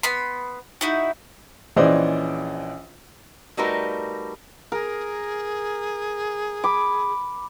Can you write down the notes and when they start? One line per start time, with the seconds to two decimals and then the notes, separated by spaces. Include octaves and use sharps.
0.03 B3 B5 C6
0.81 D#4 E4 F#4
1.76 A#1 E3 C#4 C5 D5 D#5
3.57 G3 A3 D#4 F#4 A#4 B4
4.72 G#4 A#4
6.64 B5 D6